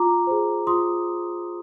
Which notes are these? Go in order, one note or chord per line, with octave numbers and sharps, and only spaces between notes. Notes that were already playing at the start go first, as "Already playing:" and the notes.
Already playing: F4 A#5 D6
G#4 C5
F4 C6 D#6